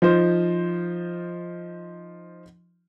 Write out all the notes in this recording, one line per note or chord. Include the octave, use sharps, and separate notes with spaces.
F3 D#4 F4 C5